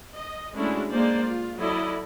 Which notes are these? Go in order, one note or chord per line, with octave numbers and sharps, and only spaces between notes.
D#5
G#3 A3 C#4 D4 E4 F#4
G#3 A#3 C5 D5
F4
F#3 E4 A4 D5 D#5